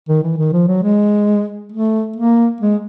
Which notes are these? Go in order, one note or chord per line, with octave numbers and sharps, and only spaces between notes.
D#3
E3
D#3
F3
F#3
G#3
A3
A#3
G#3